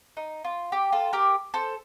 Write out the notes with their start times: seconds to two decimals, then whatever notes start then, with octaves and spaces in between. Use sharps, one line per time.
0.17 D#4
0.44 F4
0.72 G4
0.92 F4 A4
1.13 G4 A#4
1.54 A4 C5